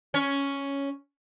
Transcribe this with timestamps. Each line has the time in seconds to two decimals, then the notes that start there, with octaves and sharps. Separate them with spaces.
0.14 C#4 C#5